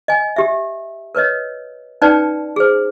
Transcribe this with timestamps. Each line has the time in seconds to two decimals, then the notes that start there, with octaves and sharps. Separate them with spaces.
0.08 D#5 G#5
0.36 G4 E5
1.15 A#4 B4 C#5 D#5
2.02 C#4 D#4 B4 D5 G5 A5
2.56 G#4 C5